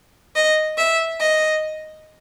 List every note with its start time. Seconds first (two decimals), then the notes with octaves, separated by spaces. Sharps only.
0.36 D#5
0.77 E5
1.20 D#5